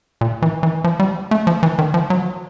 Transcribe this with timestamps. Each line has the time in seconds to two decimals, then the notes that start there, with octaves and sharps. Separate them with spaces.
0.21 A#2
0.42 E3
0.63 E3
0.84 F3
1.00 G3
1.31 A3
1.47 F3
1.63 E3
1.79 D#3
1.94 F3
2.10 F#3